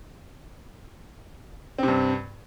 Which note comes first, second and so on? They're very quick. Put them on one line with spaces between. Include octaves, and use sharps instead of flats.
C4 C3 G2